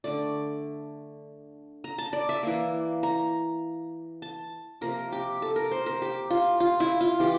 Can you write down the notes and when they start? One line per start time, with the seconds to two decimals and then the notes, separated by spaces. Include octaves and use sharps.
0.04 D3 A3 D5
1.84 A#5
1.98 A5
2.13 D5
2.29 E5
2.43 E3 A#3
3.03 A#5
4.22 A5
4.81 C3 F3 A#3 A#4
5.12 G4
5.42 A4
5.56 A#4
5.71 C5
5.86 A#4
6.02 G4
6.30 F4
6.60 F4
6.80 E4
7.01 F4
7.20 E3 G4